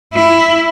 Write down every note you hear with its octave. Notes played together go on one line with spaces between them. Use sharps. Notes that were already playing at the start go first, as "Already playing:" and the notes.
E4